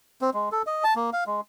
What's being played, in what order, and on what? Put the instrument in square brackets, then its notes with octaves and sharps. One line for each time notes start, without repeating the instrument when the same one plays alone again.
[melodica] C4
G#3
A4
D#5
A5
A#3
F5
G#3